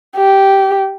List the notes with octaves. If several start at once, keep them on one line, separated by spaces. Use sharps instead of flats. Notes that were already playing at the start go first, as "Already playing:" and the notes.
G4